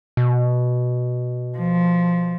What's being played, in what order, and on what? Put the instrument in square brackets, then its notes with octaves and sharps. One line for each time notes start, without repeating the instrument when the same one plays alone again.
[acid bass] B2
[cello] F3